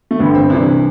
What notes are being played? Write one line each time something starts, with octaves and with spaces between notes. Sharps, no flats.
A3
A1 G2 D3 B3
C4
C2 C3 E3 D4